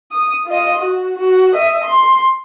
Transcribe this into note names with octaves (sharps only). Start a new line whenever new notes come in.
D#6
F4 D#5
F#4
F#4
D#5 E5
C6